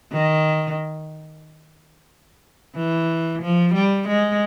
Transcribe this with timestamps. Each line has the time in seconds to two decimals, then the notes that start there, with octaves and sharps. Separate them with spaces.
0.12 D#3
2.75 E3
3.42 F3
3.74 G3
4.08 G#3